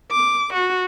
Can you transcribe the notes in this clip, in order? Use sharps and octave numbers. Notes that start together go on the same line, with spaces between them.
D6
F#4